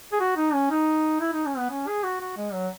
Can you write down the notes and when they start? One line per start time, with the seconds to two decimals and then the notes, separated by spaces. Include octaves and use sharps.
0.13 G#4
0.20 F#4
0.37 D#4
0.53 C#4
0.70 D#4
1.20 E4
1.33 D#4
1.46 C#4
1.58 B3
1.71 C#4
1.87 G#4
2.04 F#4
2.21 F#4
2.37 G#3
2.53 F#3